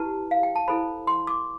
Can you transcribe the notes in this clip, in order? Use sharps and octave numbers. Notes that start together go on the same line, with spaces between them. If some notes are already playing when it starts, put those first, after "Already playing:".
Already playing: E4 G4 B4 A5
F5
G5
A5
E4 A4 C5 B5
C6
D6